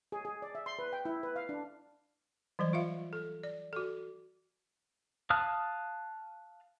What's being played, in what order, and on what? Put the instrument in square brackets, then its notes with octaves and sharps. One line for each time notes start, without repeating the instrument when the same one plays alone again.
[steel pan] G#4
G#4
D5
E5
C6
B4
G5
E4
B4
F5
D4
[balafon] E3 F#3 G3 C5
F4 E5 F5
A4
D5
F#4 A4
[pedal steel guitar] F5 A5 D#6 F6 F#6